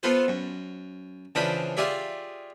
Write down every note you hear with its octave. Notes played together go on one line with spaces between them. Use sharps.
B3 F4 A4 B4 C5
F#2
C#3 E3 F3 D4 G5 B5
F4 G4 G#4 D5 E5